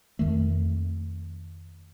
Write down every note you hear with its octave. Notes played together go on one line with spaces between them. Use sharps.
F2 D#3 A3